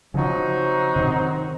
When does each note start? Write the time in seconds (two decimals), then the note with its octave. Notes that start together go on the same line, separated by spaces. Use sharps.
0.14 C#3 F3 F#3 C4 D#4 F#4
0.96 C3 D#3